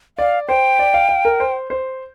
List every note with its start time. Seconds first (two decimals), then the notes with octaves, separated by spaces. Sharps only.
0.18 D5 F5
0.48 C5 G5
0.79 D5
0.94 F5
1.09 F5
1.25 A#4
1.40 C5
1.70 C5